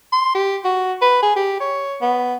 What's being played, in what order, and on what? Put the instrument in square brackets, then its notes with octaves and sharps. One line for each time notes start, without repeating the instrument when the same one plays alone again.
[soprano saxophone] C6
G4
F#4
B4
G#4
G4
C#5
B3